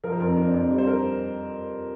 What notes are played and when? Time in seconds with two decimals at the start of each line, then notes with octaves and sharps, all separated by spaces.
0.04 F3 A#4
0.12 C5
0.20 F2 A#4
0.37 C4 D4
0.53 F2
0.71 G3 D4
0.78 C5
0.87 A#4